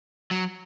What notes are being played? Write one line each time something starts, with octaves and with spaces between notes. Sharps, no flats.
F#3